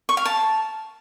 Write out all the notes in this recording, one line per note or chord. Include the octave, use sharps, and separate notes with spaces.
C#6
F5
A5